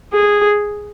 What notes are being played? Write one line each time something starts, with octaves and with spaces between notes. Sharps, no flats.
G#4